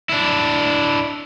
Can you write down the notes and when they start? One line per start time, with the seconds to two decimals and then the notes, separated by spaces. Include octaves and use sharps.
0.09 D4 E4